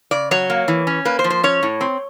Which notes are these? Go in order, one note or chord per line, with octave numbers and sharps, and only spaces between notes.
C#3 D5
F#3 C#5
A#3
E3
C#4
A#3 B4
C5
F3
C5
C#4 C#5
A2
C4